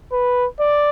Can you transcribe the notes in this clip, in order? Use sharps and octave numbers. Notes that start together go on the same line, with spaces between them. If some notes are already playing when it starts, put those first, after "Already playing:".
B4
D5